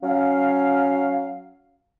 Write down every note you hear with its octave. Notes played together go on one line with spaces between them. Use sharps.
F#3 C#4 F5